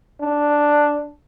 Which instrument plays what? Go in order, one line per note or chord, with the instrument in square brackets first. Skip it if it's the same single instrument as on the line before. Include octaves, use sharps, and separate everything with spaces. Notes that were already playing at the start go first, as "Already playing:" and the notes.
[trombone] D4